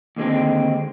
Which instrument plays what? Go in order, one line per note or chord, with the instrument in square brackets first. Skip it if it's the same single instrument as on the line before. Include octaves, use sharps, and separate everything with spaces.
[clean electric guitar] D#2 D3 G#3 C4